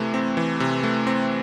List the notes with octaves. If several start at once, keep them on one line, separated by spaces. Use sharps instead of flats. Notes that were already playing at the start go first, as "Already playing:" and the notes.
Already playing: C3 E3 A3
C4
E3
C3
A3
C4